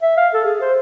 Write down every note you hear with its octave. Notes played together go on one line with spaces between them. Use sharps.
E5
F5
A4
G#4
C5